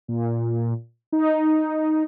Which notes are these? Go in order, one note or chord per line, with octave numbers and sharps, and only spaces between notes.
A#2
D#4